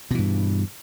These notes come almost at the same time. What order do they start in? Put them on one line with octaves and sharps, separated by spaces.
B2 E3 G2